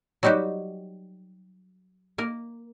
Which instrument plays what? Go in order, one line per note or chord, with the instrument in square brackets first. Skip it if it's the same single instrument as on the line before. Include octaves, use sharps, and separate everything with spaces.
[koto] F#3 G3 D#4 F#4 G4
A#3 A#4